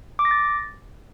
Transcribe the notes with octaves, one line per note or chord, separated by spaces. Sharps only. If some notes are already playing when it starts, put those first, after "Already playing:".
D6
A#6
A6